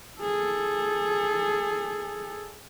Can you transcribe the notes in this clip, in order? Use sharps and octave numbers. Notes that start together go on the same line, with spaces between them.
G#4 A4